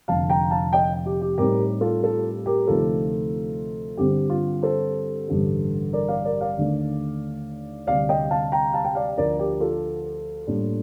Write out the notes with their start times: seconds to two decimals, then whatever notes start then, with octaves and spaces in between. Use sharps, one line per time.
0.08 F1 F2 D3 F5 A5
0.30 G5 A#5
0.51 F5 A5
0.73 D#5 G5
1.06 G4
1.22 G4
1.38 A2 G3 C4 D#4 G4 A#4
1.81 F4 A4
2.03 F4 A4
2.46 G4 A#4
2.67 D2 C3 F3 A3 D#4 F4 A4
3.97 G2 D3 G3 C4 G4
4.30 F4
4.63 A4 C5
5.28 A1 G2 D3 G3
5.93 A#4 D5
6.08 D5 F5
6.25 A#4 D5
6.41 D5 F5
6.57 D#2 D3 A3 D4
7.87 D2 C3 G3 D5 F5
8.09 D#5 G5
8.31 F5 A5
8.52 G5 A#5
8.73 F5 A5
8.85 G5
8.95 D5 F5
9.17 D2 D3 F3 A#4 D5
9.39 G4 A#4
9.60 F4 A4
10.47 A2 G3 A#3 D4